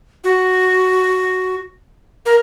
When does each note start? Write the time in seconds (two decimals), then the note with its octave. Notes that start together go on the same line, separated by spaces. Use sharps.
0.24 F#4
2.26 A#4